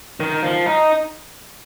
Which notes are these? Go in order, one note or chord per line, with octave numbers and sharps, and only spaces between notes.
D#3
F3
D#4